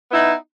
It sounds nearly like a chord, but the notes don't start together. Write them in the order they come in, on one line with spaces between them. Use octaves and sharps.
B3 E4 D#4